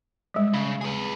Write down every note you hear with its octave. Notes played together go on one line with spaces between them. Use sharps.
G3 G#3
C#3
G#4 B4